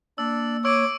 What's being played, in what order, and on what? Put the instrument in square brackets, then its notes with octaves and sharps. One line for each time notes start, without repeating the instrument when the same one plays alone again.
[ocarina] A#3 [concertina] D4 D5 [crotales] E6
[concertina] C#5 [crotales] C#6 E6 D7 [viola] D6